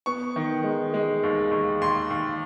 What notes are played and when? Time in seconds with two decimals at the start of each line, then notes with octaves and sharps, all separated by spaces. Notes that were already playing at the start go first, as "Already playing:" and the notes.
0.06 B3 C#6
0.36 D#3
0.64 G#3
0.94 G#3
1.23 D#2
1.51 D#2
1.81 D#2 C6
2.10 D#2